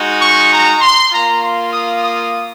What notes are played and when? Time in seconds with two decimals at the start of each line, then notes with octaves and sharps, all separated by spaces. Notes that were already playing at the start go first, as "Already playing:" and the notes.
Already playing: G#3 D#4 F#4
0.21 C#6
0.51 A#5
0.81 C6
1.12 A#3 F4 A#5
1.42 C6
1.72 D#6
2.03 D#6